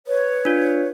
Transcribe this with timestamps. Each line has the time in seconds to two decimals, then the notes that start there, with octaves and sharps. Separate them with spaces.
0.07 B4 C#5
0.45 D4 F4